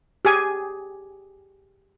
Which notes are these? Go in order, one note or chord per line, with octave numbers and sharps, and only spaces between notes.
G4 G#4 G#5